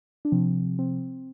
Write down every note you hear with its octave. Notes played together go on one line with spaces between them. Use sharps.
D4
C3 F3 C4
C4